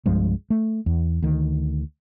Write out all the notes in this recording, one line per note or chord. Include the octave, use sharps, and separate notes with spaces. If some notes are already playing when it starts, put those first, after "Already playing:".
C2 G2 F3 G#3
A3
E2
D2 D#3